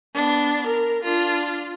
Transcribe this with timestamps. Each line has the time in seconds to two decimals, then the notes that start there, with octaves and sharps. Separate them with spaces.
0.14 B3 D4
0.67 A#4
1.03 D4 F4